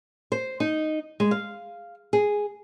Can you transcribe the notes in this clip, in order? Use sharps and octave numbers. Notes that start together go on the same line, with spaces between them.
C5
D#4
G#3
F5
G#4